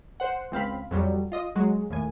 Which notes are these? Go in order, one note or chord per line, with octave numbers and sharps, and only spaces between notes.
C5 F#5
C#2 C4 F5 B5
F2 F#3 G3
F4 D#5 D#6
F#3 G#3 F#4
D#2 A2 G#5